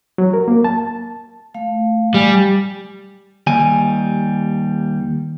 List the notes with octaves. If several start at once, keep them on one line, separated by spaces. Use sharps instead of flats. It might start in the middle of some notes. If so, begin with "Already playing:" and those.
F#3
A#4
A#3
A5
A3 F5
G3 G#5
D#2 G3 G#5